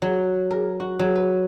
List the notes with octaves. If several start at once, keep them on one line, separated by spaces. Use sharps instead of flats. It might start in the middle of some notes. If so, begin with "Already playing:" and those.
F#3
A#4
F#4
F#3
B4